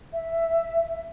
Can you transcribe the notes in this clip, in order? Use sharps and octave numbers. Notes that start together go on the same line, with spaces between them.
E5